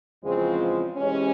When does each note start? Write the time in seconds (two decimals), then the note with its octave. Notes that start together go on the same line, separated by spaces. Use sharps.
0.24 E2 C#3 F3 G#3 C4
0.98 C3 E3 G#3 C#4